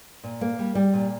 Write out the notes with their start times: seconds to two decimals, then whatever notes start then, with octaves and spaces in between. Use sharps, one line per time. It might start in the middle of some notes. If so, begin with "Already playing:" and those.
0.24 A#2
0.41 A#3
0.59 G3
0.75 G3
0.94 A#2